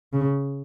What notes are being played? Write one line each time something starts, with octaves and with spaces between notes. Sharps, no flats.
C#3